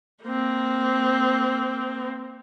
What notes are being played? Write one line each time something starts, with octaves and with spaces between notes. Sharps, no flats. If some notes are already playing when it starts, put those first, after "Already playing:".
A#3 C4